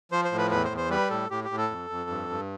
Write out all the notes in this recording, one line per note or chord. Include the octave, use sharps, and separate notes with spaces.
F3 C5
C5
A2
B4
E2 B4
C5
E2
C5
G3 B4
A2 A4
A2 G4
G4
A2
A4
F2
F2
G2
G2